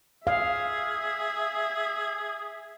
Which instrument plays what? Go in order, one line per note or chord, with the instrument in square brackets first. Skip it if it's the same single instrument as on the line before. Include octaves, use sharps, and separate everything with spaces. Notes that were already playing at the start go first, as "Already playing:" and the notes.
[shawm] G#4 [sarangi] E5 [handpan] F5